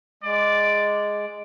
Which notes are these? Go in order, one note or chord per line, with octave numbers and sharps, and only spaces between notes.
G#3 D5